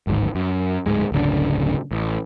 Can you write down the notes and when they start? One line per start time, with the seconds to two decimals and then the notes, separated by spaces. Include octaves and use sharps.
0.07 D1 G#1 G#2
0.35 F#2
0.86 D1 G#2 G#3
1.12 D1 G1 C#3 D4
1.91 A1